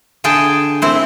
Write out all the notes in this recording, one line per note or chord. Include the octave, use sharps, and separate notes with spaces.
D3 G#4 G5 A5
C4 E4 C5